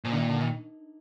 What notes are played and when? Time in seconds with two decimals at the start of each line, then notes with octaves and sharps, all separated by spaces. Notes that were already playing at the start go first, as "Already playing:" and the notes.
0.04 A#2 F3
0.12 D3
0.17 D#3
0.29 D3
0.41 D#3